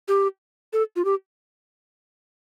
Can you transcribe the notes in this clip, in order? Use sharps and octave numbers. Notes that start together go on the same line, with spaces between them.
G4
A4
F4
G4